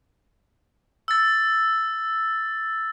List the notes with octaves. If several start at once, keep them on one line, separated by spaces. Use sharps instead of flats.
E6 A6